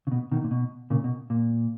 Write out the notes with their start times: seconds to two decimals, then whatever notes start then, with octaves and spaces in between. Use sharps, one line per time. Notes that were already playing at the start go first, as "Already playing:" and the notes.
0.07 C#3
0.11 B2
0.31 B2 D#3
0.44 A#2
0.51 B2
0.90 A#2 C#3
1.04 B2
1.30 A#2